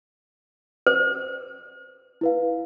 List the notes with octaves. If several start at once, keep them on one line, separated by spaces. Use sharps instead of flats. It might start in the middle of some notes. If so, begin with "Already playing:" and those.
C5
E4 B4 F5